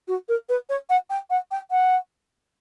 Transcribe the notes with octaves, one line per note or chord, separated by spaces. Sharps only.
F#4
A#4
B4
C#5
F#5
G5
F#5
G5
F#5